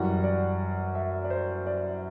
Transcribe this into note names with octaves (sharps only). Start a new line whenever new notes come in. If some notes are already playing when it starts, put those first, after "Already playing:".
Already playing: F#2 E3 G3 F#5
D5
E5
D5
C5
D5